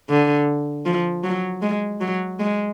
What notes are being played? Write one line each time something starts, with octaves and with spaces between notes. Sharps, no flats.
D3
F3
F#3
G#3
F#3
G#3